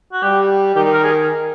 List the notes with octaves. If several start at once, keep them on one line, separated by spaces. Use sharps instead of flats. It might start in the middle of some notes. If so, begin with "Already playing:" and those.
F#4
G3 G4
D#3 G4
A#4
G#4